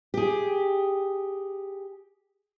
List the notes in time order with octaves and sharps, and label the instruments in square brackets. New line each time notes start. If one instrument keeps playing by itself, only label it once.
[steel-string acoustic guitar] G4 G#4